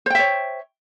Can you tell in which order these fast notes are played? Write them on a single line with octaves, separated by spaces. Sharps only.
C5 G5 E5 C#5